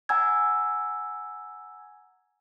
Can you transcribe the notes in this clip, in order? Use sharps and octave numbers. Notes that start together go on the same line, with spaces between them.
F#5 G#5 A#5 E6 G#6